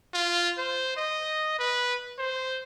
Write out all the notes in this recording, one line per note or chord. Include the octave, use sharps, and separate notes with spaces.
F4
C5
D#5
B4
C5